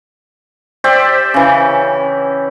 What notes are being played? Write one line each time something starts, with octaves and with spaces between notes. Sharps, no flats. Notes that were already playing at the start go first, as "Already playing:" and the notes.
G4 C5 D5 E5
C#3 E3